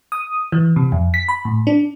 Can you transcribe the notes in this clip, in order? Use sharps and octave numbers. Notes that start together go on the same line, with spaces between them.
D#6
E3
C3
F2
B6
B5
A2
D4